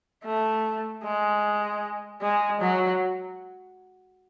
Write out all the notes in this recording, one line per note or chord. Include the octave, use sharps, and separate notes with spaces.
A3
G#3
G#3
F#3